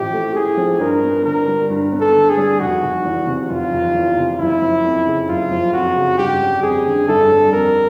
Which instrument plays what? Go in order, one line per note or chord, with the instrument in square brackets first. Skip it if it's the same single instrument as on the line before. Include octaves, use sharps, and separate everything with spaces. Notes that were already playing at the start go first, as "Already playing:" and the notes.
Already playing: [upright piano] A1 A2 F3 [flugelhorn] G4
[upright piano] A3
[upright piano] A2 [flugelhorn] G#4
[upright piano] F3
[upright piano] G2 [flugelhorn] A#4
[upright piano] B3
[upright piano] D3 [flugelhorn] A#4
[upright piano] G3
G2
B3
[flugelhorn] A4
[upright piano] D3
[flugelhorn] G#4
[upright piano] G3
[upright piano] F1 [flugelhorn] F#4
[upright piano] F1
E2
C3
[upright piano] F1 [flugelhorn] F4
[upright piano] F1
E2
C3
[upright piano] F#1 [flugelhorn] E4
[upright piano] F3
F2
C#3
[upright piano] F#1 [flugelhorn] F4
[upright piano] F3
[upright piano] F2 [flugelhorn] F#4
[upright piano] C#3
[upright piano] G1 [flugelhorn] G4
[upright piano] G3
[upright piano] F2 [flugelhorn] G#4
[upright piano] D3
[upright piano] G1 [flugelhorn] A4
[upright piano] G3
[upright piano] F2 [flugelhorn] A#4